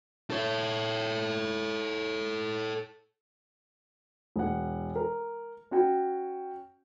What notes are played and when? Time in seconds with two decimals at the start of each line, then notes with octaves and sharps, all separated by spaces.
0.31 A4 C#5
4.36 E1 F#5
4.96 A#4
5.71 C#4 F#4 G5